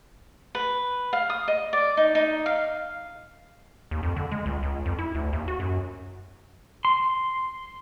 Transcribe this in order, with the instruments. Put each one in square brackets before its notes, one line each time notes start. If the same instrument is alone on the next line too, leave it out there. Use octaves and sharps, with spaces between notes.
[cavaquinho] B4
F5
D#6
D#5
D5
D#4
D#4
F5
[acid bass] D#2
F2
D3
G#3
C#2
C#2
F2
E4
D2
D#2
F#4
F#2
[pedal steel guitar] C6